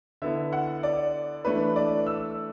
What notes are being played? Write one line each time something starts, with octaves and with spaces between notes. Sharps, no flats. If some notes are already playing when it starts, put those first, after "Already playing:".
D3 B3 E4 E5
F#5
D5
E3 A3 D4 B4
D5
E6